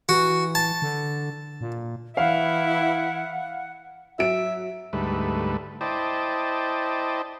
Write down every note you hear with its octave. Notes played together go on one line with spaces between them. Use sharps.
E3 F#4
A5
D3
A#2
E3 E4 F5 F#5
F#3 E5 D7
D2 G#2 G3 A3 B4
E4 C5 D5 D#5 G5 A5